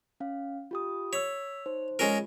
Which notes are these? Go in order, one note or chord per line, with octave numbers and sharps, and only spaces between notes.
C#4 F5
F4 G4 D#6
C#5 E6 B6
D#4 C5
G#3 C#4 F4 A#4